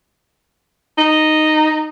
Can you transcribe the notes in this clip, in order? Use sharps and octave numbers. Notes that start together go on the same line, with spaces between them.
D#4